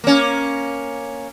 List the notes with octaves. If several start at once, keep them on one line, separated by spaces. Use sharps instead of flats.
A#3 C#4